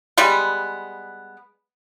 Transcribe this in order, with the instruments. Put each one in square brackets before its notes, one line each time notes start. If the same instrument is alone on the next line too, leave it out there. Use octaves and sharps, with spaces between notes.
[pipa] G3 G#3 B3